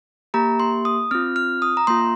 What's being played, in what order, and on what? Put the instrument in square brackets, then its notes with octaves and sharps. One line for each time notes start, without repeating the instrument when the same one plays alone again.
[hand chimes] A#3 G4 A#5
C6
D#6
C4 F4 F6
F6
D#6
A#5
A#3 F4 C6